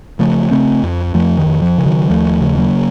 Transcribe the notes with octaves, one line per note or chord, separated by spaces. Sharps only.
C#3 F3 A3
C#3 A3 C4
F2
F2 F3 A3
D#3
F2
F3
C#3
D#3 F#3
D#2 F3 A3
C#3
F#3 A#3